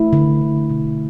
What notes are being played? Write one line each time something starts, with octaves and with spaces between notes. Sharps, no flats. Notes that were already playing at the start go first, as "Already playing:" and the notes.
Already playing: A3 E4
D3
D3
B2